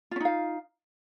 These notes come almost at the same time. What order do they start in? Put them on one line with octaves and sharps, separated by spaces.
F4 C#4 D#4 F5